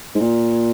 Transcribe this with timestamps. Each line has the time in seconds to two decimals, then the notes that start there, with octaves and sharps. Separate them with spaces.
0.15 G#2
0.21 A#2